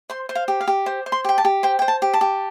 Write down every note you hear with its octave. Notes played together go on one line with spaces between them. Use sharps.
C5 C6
C5
F5
G4
F5
G4
C5
C5
C6
G4 G5
A5
G4
C5 G5
C5 G5
A5
G4
A5
G4